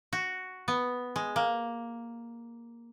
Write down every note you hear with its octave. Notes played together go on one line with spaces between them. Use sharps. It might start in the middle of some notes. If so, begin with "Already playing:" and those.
F#4
B3
G#3
A#3